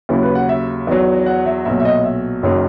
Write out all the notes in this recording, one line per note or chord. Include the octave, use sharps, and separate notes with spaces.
D#2 C#3 F#3 E4
B4
F#5
E5
E2 D#3 F#3
F#5
E5
B1 A#2 F#3 E5
E5
D#5
E5
F#1 F#2 D#3 F#3